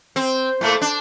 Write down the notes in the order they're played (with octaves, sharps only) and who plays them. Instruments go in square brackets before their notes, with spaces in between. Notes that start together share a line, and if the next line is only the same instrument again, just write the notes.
[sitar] C4
A2 A3 A#3
D4